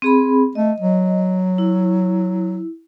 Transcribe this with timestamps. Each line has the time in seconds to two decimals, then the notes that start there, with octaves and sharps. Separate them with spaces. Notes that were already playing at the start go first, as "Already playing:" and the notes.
0.02 C4 G#4 B5
0.55 A3 D#5
0.80 F#3
1.58 E4